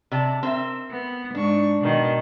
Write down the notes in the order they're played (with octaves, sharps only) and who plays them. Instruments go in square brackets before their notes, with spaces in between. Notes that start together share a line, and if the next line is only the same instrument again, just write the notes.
[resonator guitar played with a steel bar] C3 D5 A5
C4 A#4 E5
[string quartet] B3
[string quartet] G#2 C#6 [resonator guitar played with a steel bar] D4
[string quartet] B2 D#3